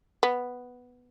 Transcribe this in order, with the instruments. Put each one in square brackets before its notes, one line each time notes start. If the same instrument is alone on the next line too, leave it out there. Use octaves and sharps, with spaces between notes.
[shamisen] B3